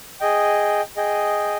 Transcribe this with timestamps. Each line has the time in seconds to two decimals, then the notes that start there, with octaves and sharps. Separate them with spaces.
0.20 G#4 D#5 G5
0.96 G#4 D#5 G5